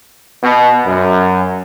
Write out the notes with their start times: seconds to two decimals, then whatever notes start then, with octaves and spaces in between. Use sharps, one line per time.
0.43 B2
0.86 F#2